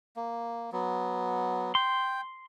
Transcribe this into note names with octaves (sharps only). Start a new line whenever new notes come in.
A#3
F#3 B3
G5 C6